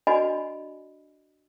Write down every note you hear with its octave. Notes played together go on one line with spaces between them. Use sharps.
D4 F#4 D5 D#5 G#5 B5